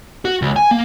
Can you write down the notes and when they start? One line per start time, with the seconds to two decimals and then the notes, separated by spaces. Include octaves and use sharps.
0.25 F#4
0.42 C#2
0.56 G#5
0.71 A#3